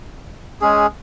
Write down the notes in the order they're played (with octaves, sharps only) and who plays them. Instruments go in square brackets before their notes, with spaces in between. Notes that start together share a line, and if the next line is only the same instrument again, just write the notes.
[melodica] G#3 C#4 G#4